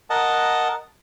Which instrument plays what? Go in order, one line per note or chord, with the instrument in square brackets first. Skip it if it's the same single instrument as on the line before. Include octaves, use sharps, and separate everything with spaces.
[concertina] A#4 D#5 F#5 A5